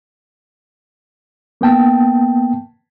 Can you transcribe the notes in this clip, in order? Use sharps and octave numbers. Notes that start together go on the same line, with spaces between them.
A#3 B3 G5 A5